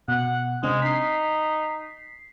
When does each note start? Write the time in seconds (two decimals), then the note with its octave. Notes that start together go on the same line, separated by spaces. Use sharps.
0.08 B2 F#5
0.63 C3 G#3 C4 D4
0.82 D#4 B6 C7